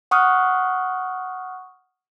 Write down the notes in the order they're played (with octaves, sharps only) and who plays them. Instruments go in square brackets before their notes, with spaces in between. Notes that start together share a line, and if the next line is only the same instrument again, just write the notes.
[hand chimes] F#5 C#6 D#6 F6 F#6